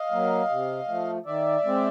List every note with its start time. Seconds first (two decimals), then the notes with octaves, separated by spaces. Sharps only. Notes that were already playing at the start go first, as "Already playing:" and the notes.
Already playing: D#5 F5
0.12 F#3 A#3
0.50 C3
0.88 F3 A3
1.26 D#3 D5 E5
1.64 G#3 C4